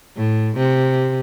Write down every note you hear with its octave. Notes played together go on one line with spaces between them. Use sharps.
A2
C3